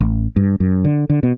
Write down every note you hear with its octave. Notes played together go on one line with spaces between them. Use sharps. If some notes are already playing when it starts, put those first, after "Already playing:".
A1
G2
F#2
D3
D3
B2